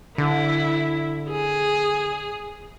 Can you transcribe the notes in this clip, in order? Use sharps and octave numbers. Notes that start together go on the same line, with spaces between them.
D3 E4
G#4